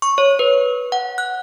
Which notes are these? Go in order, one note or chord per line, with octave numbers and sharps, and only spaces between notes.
C#6
C#5
B4
F#5
F#6